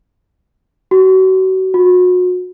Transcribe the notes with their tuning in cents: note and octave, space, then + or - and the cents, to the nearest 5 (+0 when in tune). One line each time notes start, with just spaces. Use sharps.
F#4 +35
F#4 -35